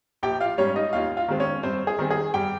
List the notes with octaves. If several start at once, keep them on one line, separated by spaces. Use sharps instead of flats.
A#1 G4 G5
F4 F5
G#2 G3 C#4 C#5
D#4 D#5
D#2 F4 F5
F4 F5
D#3 G#3 C4
C#4 C#5
G2 C4 C5
G#4
D#3 G3 C4
G#4
G2 G4 G5